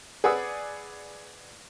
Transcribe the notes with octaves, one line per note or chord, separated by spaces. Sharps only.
G#4 B4 D5 F#5 D#6 E6